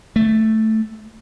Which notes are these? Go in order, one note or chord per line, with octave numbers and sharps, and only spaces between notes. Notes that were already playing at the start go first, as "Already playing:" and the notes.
A3